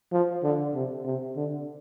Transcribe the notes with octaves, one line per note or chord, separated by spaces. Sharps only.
F3
D3
C3
C3
D3